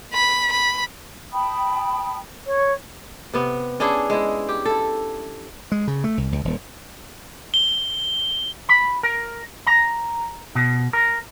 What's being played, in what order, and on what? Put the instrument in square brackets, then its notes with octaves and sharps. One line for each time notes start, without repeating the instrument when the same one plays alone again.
[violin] B5
B5
[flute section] G5 A5 B5 D#6
[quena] C#5
[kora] C3 B3
C#4 D4 E4 G#4
G#3 E4
G4
E4 A4
[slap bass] G#3
C#3
A3
C2
C#2
D#1
[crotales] G7
[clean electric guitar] B5
A#4
A#5
B2
A#4